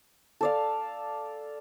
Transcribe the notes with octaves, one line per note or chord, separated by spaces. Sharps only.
A4 D5 F5